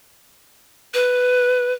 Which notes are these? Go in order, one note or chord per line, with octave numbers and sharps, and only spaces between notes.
B4